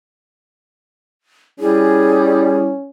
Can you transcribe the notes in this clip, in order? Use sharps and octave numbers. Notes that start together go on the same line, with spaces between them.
G3 C#4 E4 G#4